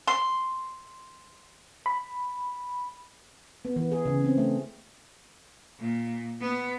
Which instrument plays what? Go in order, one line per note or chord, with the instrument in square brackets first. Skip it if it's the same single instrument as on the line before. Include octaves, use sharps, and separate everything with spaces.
[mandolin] C6
[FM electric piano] B5
[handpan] B3
E3
G#4
C#3
C4
A3
[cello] A#2
B3